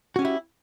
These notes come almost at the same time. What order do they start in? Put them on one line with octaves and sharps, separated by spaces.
F#4 C#4 G4 E4